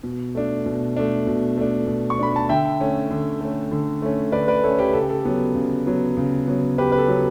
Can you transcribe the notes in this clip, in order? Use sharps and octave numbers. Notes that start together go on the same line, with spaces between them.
B2
A3 D4
B2
A3 D4
B2
A3 D4
B2
C#6
A3 D4 B5
A5
D3 E5 G5
A3 C#4
D3
A3 C#4
D3
A3 C#4
D3 B4 D5
B4 D5
A3 C#4 A4 C#5
G4 B4
C#3 A4
G4
A4
F#3 B3
C#3
F#3 B3
C#3
F#3 B3
C#3 G4 B4
B4
A4
F#3 B3